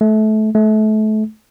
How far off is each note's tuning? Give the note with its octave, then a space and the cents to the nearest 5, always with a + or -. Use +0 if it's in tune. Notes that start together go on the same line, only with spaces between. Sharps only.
A3 -25
A3 -30